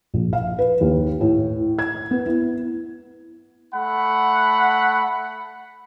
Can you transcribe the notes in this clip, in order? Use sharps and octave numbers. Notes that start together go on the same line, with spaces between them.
A#1
F5
B4
D#2
A2
G#6
B3
E4
A3 F#5 B5